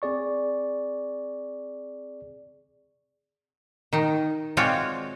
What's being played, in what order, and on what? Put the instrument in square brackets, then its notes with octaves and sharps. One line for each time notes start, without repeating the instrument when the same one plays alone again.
[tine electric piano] C4 G#4 D5 C#6
[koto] D#3 D#4
G#3 C4 F4 F#4 C#5 D5